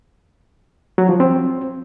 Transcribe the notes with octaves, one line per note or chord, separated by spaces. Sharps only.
F#3
F3
C4